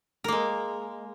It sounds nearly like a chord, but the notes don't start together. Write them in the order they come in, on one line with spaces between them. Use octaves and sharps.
A#4 A#3 G#3